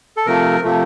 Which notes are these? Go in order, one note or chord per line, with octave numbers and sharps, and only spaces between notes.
A4
C3 F3 A3 A#4
C3 F3 A3